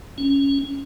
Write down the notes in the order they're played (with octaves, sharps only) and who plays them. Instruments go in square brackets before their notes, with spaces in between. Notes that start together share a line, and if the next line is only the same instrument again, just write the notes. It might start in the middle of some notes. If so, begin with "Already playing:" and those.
[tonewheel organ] C#4